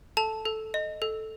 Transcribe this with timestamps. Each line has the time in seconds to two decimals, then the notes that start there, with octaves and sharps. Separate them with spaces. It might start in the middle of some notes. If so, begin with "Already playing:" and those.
0.17 A4 A5
0.46 A4
0.74 D#5
1.02 A4